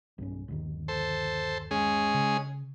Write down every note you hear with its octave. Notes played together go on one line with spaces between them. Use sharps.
B1 G2 C#4
G1 D#2 D#3
A4 C5
G#3 C#4 G#4
C#3